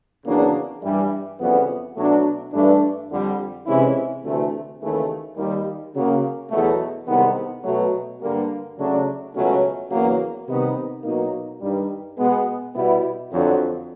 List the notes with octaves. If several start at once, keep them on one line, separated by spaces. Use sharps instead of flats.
E2 C#3 F#3 A#3 D4
G2 E3 G3
F2 C#3 E3 G3 B3
B2 F#3 A3 D4
G2 E3 A3 D4
F2 D3 G3
C3 E3 G#3 C#4 E4
D2 C3 E3 A3
D#2 C#3 E3 A3
D#2 D#3 G3
C#3 F#3 A#3
E2 B2 F#3 A3
C2 C3 D#3 G#3 B3
B2 F#3 A3
G2 D3 G3 A#3
C#3 F#3 A3 D4
C#2 B2 F#3 A3 C#4
E2 C#3 F#3 A#3
C3 D#3 G3 B3 D#4
B2 F#3 A#3 D#4
G2 D#3 G3
B2 G#3 B3
B2 G3 B3 E4
F2 D3 F#3